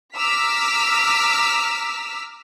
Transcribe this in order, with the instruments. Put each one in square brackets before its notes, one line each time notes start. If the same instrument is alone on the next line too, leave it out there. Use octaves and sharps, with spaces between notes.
[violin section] A#5 D6 E6 F6 B6